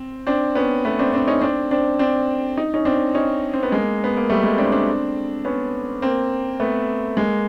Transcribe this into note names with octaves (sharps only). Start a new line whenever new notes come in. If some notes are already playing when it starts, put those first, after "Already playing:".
Already playing: C4
C4 D4
B3 C#4
A3 B3
C4 D4
C4 D4
C#4 D#4
C4 D4
C4 D4
C4 D4
D#4
C#4 D#4
C4 D4
C#4 D#4
C4
B3
G#3 A#3
B3
A#3
G3 A3
G#3 A#3
C4 D4
C4 D4
B3 C#4
A#3 C4
A3 B3
G#3 A#3